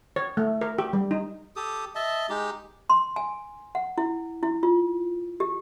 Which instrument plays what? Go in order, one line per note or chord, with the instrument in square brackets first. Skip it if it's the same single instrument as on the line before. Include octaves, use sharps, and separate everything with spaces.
[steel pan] C#5
A3
A#4
G4
G3
D#4
[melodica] G4 A4 D#6
D#5 E5 A5
G#3 D#4 G4
[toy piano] C6
G#5
F#5
E4
E4
F4
G4